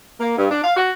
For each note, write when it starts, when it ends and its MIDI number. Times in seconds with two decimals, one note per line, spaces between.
0.20 0.35 58
0.37 0.49 43
0.51 0.62 62
0.64 0.76 77
0.77 0.91 66